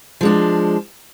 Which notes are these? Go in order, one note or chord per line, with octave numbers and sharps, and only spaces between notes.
F3 G#3 D4